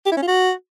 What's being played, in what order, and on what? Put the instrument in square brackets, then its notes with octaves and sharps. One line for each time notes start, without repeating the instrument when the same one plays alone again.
[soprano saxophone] G4
E4
C#4
F4
F#4